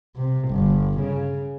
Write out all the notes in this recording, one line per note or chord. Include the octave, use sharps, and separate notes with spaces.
C3
G1
C#3